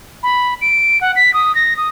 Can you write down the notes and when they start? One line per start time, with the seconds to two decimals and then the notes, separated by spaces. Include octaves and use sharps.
0.23 B5
0.61 D7
1.01 F#5
1.16 B6
1.34 D#6
1.55 A#6
1.77 D#6